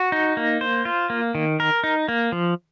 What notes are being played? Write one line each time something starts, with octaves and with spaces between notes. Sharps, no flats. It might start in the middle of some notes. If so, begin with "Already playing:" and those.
Already playing: F#4
D#4
A#3
C5
F4
A#3
D#3
A#4
D#4
A#3
F3